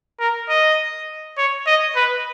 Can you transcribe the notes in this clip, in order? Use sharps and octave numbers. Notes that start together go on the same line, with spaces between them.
A#4
D#5
C#5
D#5
B4